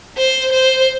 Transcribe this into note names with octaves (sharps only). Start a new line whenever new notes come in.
C5
C5